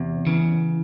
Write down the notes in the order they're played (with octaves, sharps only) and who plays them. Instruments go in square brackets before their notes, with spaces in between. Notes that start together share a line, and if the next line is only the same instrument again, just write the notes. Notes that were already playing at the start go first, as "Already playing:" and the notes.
Already playing: [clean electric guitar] E2 [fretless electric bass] C3
[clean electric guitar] C#3 [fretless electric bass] E3